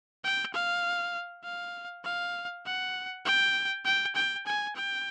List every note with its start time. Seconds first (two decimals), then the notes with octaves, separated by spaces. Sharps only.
0.24 G5
0.54 F5
1.44 F5
2.04 F5
2.66 F#5
3.25 G5
3.85 G5
4.15 G5
4.46 G#5
4.76 G5